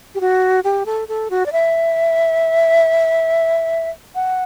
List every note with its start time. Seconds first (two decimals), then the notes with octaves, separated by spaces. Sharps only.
0.15 G4
0.21 F#4
0.64 G4
0.86 A4
1.08 A4
1.30 F#4
1.46 D5
1.52 E5
4.15 F#5